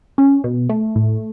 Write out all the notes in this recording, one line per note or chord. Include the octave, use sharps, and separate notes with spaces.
C#4
B2
A3
A2